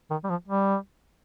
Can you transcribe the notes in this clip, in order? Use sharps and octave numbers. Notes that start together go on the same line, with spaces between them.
D#3
G3
F3
G3